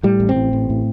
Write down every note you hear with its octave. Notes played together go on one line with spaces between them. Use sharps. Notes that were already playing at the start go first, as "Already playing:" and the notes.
A2 G3
A1
C4
A2
A1
A2